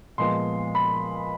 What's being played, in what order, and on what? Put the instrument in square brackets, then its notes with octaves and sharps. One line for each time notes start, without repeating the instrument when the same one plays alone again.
[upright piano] A#2 F3 G#3 B3 C6
B5